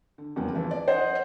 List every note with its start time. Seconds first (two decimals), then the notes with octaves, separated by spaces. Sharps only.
0.18 D3
0.36 E2 C#3 F3 G3 A#3
0.55 E3 F3
0.71 D5
0.88 C5 D#5 F#5